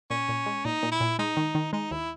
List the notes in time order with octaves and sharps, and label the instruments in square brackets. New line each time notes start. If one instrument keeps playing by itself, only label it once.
[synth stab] A#2 [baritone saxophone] C#4
[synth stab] A#2
G#3
[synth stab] A#2 [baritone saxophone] D#4
[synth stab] A#2
[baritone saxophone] E4
[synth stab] A#2
[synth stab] G#3 [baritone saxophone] D#4
[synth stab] D#3
D#3
[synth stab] G#3 [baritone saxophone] D#4
[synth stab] D#2 [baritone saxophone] E4